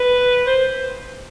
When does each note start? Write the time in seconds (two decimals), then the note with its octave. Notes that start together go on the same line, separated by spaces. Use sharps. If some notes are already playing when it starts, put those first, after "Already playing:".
Already playing: B4
0.47 C5